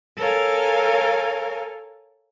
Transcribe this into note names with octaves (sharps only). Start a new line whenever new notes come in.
A4 A#4 C#5 F5 G#5